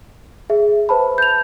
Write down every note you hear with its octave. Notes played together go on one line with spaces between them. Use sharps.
G#4 E5
B4 C5 A5 B5
G6 F7